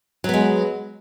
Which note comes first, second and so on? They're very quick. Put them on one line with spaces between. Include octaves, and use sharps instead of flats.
F#3 B3 G#3